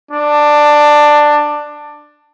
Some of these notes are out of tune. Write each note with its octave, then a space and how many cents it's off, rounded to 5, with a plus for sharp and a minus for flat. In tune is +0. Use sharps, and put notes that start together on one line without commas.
D4 +10